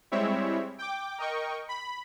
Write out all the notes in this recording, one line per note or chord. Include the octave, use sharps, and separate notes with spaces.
G3 G#3 C4 E4 C#5 E5
G5 D6
A#4 D#5 G5 C#6
B5